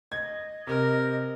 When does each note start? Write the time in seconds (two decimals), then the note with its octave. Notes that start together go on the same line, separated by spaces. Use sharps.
0.12 D#5 G#6
0.67 C3 A#4